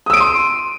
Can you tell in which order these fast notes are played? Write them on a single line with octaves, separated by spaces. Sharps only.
D#6 E6 D7 D#7 C6